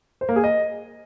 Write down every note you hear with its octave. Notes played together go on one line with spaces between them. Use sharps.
C5
A#3
G#4
D#5